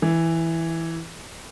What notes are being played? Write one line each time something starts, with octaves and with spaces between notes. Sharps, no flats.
E3